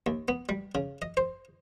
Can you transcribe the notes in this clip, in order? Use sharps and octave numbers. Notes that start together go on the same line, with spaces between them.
D#2
B3
G3
C#3
D#5
C5